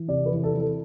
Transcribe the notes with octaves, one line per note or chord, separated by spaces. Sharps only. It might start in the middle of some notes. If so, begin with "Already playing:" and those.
Already playing: E3
C3 D5
B4
E3
A4
E3
A4